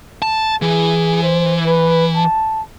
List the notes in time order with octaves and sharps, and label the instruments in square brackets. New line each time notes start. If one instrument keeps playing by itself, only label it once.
[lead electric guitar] A5
[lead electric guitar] E3 [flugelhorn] G#4
[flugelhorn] C5
B4
A5